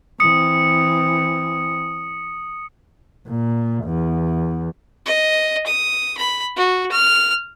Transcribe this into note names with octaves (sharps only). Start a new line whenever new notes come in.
E3 C4 D#6 C#7
A#2
E2
D#5
D#6
B5
F#4
F6